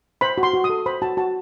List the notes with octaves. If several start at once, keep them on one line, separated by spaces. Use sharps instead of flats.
C5 B5
F#4
C6
F#4
D#6
A4
C5 B5
F#4 A5
F#4 A5